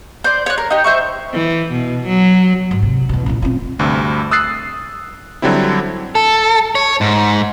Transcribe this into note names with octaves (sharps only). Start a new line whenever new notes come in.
C5 D5
C#5 F#6
A#4
D#4 G4
C5 E5 C#6
E3
B2
F#3
G#2
C3
E2 B2
A#2 E4
C4 F4
D2 G2 C3
D#6 E6 F#6 A6 C7
D3 F#3 G3 C4 E4
A4
C#5
G#2